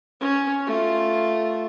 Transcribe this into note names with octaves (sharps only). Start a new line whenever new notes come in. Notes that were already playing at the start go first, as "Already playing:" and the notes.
C#4
A3 F4